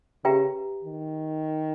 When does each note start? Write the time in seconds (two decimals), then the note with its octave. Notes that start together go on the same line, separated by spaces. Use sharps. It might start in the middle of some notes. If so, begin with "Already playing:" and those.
0.25 C#3 G4 B4 E5 G5 A#5
0.85 D#3